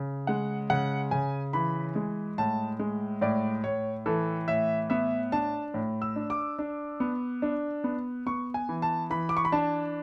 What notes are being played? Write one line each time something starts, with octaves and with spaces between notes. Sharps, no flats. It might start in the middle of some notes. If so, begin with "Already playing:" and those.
Already playing: C#3
G#3 F#5
C#3 F#5
C#3 G#5
E3 B5
G#3
A2 A5
G#3
A2 D5
A2 C#5
E3 A4
A2 E5
B3 E5
D4 A5
A2
E6
D4
D6
D4
B3
D4
B3
B3 C#6
G#5
E3
A5
E3 B5
D6
C#6
B5
D4 A5